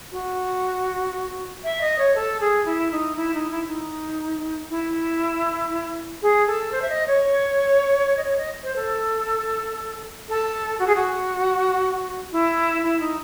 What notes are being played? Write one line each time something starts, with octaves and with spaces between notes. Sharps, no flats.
F#4
E5
D#5
C#5
A4
G#4
E4
D#4
E4
D#4
E4
D#4
E4
G#4
A4
C5
E5
D#5
C#5
D#5
C#5
D#5
C5
A4
A4
F#4
G#4
F#4
E4
E4
D#4